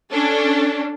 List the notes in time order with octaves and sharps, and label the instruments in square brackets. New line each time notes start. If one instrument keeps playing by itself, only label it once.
[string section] C#4 D4 A4